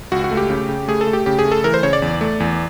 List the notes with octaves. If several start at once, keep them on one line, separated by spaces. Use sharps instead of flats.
C#2 F#4
F#4
A3
G4
C#3
C#3
A3 G#4
A4
A3
G4
C#3 G4
G#4
A3
A4
E3 A#4
C5
C#3 C#5
D5
E2
A3
E2